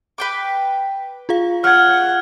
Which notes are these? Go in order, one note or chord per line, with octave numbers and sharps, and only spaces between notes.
B4 G5 D6
F4 G#4 F5
C#5 F#5 F6 G#6